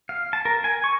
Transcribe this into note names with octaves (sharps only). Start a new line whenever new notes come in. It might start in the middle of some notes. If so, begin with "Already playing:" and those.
F5
A5
A#4
G#5
C#6